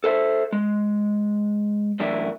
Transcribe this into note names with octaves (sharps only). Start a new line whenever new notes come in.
A4 C5 E5
G#3
F#2 A2 E3 D4 E4